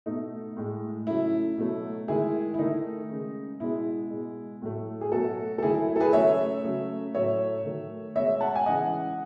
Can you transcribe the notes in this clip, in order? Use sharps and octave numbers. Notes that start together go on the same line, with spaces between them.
B2 A3 D#4
A2 G#3
C#3 F#3 A3 E4
B2 F#3 A3
D#3 G#3 E4 G#4
E4
D#3 A3 D#4
C#3 G#3
B2 G#3 E4
B2 G#3
A2 F#3 A3
G#4
B2 F#3 A3 F#4 A4
A4
D#3 F#3 A3 E4 G#4
E4
E4
A4
G#4 B4
C#3 F#3 A3 C#5 E5
C#3 F#3 A3
A2 F#3 A3 C#5 E5
D#3 F#3 A3
B2 G#3 C#5 E5
F#5 A5
G#5
C#3 E3 G#3 D#5 F#5